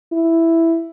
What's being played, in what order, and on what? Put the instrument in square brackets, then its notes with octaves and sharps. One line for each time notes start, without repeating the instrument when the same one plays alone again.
[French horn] E4